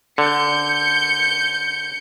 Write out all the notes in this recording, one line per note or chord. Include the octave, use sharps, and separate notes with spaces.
D3 G6 C#7